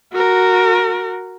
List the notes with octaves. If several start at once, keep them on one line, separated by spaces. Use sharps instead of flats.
F#4 A#4